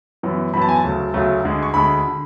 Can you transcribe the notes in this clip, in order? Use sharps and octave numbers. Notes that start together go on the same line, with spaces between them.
F#2 E3 B3
F#2 E3 B3 B5
A5
G#5
A5
D2 C#3 F#3 A3
D2 C#3 F#3 A3
D2 D3 G#3
C#6
D2 D3 G#3 B5
D3